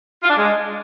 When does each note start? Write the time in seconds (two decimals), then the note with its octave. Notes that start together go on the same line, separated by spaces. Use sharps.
0.23 F4
0.30 D4
0.37 G#3